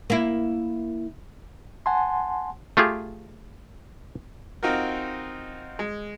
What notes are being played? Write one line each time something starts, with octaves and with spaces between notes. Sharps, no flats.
A#3 E4
F#5 G#5 A5 C6
A3 F4 G4 G#4
C4 D#4 F4 F#4 A#4
G#3